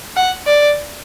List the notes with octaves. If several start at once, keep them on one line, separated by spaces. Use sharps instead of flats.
F#5
D5